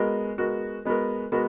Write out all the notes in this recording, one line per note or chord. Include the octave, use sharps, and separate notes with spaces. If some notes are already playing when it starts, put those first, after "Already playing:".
Already playing: G#3 B3 F#4 A#4
G#3 B3 F#4 A#4
G#3 B3 F#4 A#4
G#3 B3 F#4 A#4